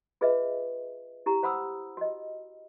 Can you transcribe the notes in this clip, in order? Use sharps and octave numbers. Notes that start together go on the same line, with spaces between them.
F4 G#4 B4 D#5 E5
E4 G4 A#5
C5 F#5 B5 D#6 E6
F#4 D#5